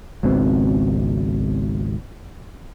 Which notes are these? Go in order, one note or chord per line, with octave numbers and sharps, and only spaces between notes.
G#1 C#2 B2 C4